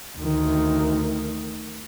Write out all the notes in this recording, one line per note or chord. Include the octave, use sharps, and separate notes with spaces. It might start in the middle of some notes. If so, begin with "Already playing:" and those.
D2 D#3